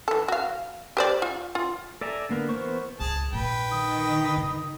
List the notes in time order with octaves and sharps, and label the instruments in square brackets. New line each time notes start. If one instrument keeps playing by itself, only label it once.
[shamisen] E3 A4
F#4 F5
G4 C5 D5
F4
F4
[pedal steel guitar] A4 D5 E5 G#5 A#5
D3 A#3 B3 A#4
E3 B3 A#4 C5 C#6
[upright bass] C#2 G2 [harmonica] G#4 A5
[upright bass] A#1 F4 [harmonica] B4 G5
[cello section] D#3 [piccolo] D#6
[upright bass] C#3